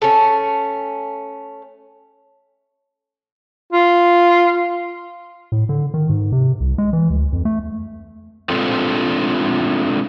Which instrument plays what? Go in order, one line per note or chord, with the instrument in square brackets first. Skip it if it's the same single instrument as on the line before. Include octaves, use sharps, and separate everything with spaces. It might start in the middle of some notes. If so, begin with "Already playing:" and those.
[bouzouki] A3 C#4
[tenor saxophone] F4
[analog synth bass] A2
D3
D#3
G#2
C3
C2
G#3
E3
D2
F2
A3
[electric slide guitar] G#3 A3 C4 D4 F4 A4